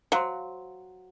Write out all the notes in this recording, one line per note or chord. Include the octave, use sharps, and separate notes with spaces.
F#3 C5 F5 C6